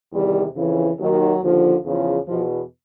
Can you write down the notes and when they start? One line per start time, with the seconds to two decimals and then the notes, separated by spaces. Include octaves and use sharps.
0.12 E2 C3 D#3 G3
0.55 F2 C#3 E3
0.99 D#2 D#3 F#3
1.41 D#2 D3 F3
1.84 E2 C#3 F3
2.26 E2 B2 F3